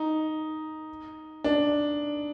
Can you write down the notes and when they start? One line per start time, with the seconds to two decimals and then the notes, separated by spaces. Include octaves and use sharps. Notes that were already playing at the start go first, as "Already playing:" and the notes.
Already playing: D#4
1.44 D4